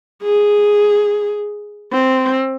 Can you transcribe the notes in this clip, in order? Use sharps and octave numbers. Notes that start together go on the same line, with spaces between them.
G#4
C4